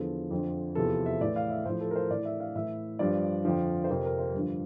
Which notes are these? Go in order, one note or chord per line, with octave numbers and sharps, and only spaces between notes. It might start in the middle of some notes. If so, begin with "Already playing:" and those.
Already playing: E2 D3 F3 A4
F2 D3 F3
E2 C3 F3 A4
E5
A2 E3 D5
F5
E5
A2 F3 C5
A4
A#4
C5
A2 E3 D5
E5
F5
A2 E3 E5
G2 F3 D5
F2 D3 F3
C5
F2 C3 F3 A#4
A#4
C5
G2 D3 F3